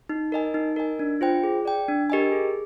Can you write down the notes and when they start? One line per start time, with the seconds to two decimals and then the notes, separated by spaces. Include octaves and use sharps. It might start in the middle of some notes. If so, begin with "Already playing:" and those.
0.09 D#4
0.32 A#4 D#5 G#5
0.54 D#4
0.76 A#4 D#5 G#5
0.99 D4
1.21 F4 C5 G5
1.44 G#4
1.65 D5 G5
1.88 D4
2.10 G4 A#4 D#5 G#5
2.32 G#4